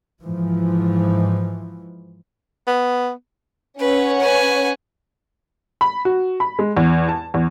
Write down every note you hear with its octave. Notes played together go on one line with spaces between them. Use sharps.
G#2 E3 F3
B3
C#4 B4 C#5 F#5
B4 G#5
B5
F#4
B5
G#3
E2
A5
E2